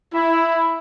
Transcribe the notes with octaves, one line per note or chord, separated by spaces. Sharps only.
E4